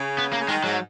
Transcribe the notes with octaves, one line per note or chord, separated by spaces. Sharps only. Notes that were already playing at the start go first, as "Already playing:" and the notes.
Already playing: C#3
B3
A#3
C#3
D#3 G#3
G#2 F#3